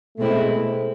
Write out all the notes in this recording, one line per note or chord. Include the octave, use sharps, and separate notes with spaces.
B2 G#3 A3 C4 E4